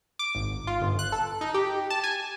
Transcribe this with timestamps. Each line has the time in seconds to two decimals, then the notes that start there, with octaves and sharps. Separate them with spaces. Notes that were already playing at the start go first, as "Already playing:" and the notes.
0.19 D6
0.35 G#1
0.67 F4
0.81 G1
0.99 F#6
1.12 A4
1.41 D#4
1.54 G4
1.90 A5
2.04 G#5